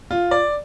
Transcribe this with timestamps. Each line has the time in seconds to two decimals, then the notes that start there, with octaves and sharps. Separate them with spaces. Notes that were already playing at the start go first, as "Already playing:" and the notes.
0.11 F4
0.31 D5